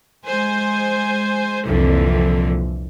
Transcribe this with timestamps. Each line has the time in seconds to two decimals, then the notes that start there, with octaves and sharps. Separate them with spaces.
0.26 G#3 C5 G#5
1.65 C2 F2 A#2 D3 E3